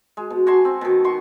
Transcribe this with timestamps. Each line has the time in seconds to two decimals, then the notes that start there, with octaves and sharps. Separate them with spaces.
0.17 G#3
0.30 B2
0.47 F#4 G#5 A5 C6
0.65 C4
0.81 B2 D#3
1.04 F#4 C6 C#6